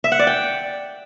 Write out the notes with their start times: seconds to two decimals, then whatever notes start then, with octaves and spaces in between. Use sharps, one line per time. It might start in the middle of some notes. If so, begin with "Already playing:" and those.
0.04 E5
0.12 F#5
0.19 D5
0.27 G5